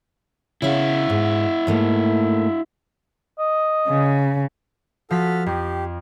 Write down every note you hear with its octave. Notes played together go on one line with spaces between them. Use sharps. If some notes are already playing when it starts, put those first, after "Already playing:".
C#3 E4 F#4 F5
G#2
G#2 A3 A#3
D#5
C#3
F3 F#4 A4 F6 B6
F2 G4